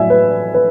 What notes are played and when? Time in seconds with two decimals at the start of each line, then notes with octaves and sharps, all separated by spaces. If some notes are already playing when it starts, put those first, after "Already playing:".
Already playing: A2 F#3 E5 G#5
0.10 B4
0.54 B4